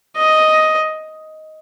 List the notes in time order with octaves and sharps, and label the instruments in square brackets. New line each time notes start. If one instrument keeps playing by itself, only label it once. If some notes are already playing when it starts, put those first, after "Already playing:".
[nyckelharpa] D#5